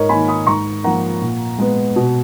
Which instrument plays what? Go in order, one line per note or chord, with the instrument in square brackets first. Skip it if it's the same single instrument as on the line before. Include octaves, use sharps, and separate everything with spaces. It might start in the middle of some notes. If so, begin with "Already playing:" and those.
Already playing: [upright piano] G#2 A#4 C#5 D#5
D#3 A#3 G#5 B5
B5 D#6
G#2 A#5 C#6
F3 A#3 F#5 A#5
A#2
G#3 B3
B2